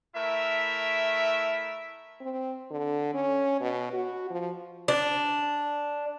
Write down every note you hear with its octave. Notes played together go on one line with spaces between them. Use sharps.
A3 E4 A#4 E5
C4
D3
C#4
B2
F#4
F3
D4